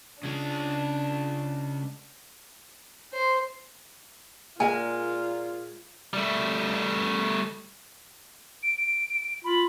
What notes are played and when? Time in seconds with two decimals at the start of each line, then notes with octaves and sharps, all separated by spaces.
0.23 C#3 G#3 D4
3.13 C5
4.60 A#2 G#3 F4 A#4 G#5
6.13 G3 A3
8.63 D7
8.77 D7
9.44 F4 B5